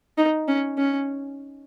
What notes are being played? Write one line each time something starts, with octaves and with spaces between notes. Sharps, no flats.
D#4
C#4
C#4